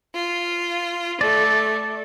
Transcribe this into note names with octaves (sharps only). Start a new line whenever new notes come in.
F4
A3 D5